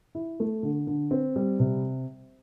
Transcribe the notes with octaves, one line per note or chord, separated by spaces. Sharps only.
E4
A3
D3
D3
C4
G3
C3